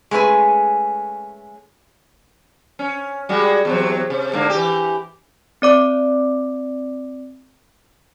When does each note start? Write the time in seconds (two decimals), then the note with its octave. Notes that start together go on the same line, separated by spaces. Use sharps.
0.11 G#3 A3 C#4 B4 G#5
2.79 C#4
3.29 G3 G#3 F#4
3.65 E2 C3 F#3
4.10 C3
4.33 G#2 D3 A#3
4.50 E3 G4
5.62 C4 D5 D6